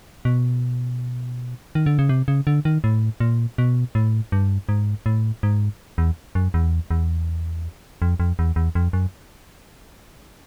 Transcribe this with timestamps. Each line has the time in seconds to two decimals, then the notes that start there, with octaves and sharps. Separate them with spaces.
0.25 B2
1.75 D#3
1.86 D3
1.99 C#3
2.09 C3
2.28 C#3
2.47 D3
2.65 D#3
2.84 A2
3.20 A#2
3.58 B2
3.95 A2
4.32 G2
4.69 G#2
5.06 A2
5.43 G#2
5.98 E2
6.35 F#2
6.54 E2
6.91 E2
8.02 F2
8.20 F2
8.39 E2
8.56 E2
8.75 F2
8.93 F#2